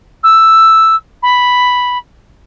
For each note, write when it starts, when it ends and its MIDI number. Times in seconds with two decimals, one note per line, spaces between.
0.23 0.95 88
1.22 1.98 83